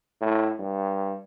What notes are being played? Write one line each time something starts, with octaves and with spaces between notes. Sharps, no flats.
A2
G2